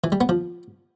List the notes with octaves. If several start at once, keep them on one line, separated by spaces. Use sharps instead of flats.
E3
G3
B3
F3